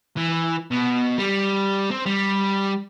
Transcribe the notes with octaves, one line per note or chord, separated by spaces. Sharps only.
E3
B2
G3
C4
G3